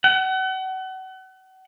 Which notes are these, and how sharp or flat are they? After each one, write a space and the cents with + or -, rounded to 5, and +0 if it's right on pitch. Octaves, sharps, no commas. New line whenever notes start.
F#5 +35